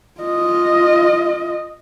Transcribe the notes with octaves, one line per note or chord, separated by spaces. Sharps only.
F4 D#5